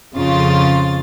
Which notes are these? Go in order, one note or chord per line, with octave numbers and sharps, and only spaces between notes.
F2 C#3 F4 A6